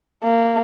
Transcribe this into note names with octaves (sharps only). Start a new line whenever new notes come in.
A#3